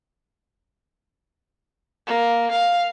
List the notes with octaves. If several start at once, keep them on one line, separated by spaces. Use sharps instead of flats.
A#3
F5